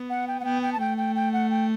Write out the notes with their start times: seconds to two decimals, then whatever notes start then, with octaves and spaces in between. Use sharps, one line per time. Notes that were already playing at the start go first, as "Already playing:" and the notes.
Already playing: B3
0.10 F#5
0.28 G5
0.40 F#5
0.45 B3 G5
0.63 G5
0.72 A5
0.80 A3 G5
0.98 G5
1.16 G5
1.33 F#5
1.50 G5